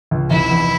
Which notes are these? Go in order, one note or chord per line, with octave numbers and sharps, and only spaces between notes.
C#2
F1 E4
E2